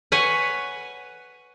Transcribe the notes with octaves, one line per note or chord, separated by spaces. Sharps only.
B4 C#5 F#5 G#5